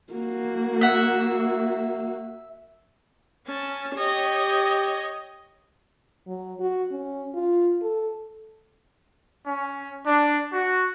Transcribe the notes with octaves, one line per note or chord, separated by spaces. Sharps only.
A#3 F#4
E5 F#5
C#4 A5
G4 C#5 D#5
F#3
F#4
C#4
F4
A4
C#4
D4
F#4